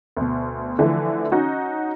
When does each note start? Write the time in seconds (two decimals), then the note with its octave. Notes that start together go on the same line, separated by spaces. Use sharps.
0.17 D2 B2
0.79 D3 E3 F3 A3
1.32 C#4 D#4 F#4